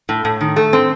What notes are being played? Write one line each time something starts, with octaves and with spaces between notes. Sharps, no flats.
A2
A2
D#3
A3
C4